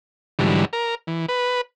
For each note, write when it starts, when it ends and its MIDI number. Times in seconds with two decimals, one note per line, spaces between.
0.39 0.65 44
0.39 0.65 50
0.39 0.65 52
0.39 0.65 54
0.39 0.65 55
0.73 0.95 70
1.07 1.26 52
1.29 1.61 71